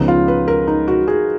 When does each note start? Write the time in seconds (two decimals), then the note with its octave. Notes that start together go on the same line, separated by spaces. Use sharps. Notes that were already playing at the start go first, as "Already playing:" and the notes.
Already playing: C#2 C#3 F3 B3 D#4
0.08 F4
0.28 B4
0.48 A#4
0.67 D#4
0.88 F#4
1.08 G#4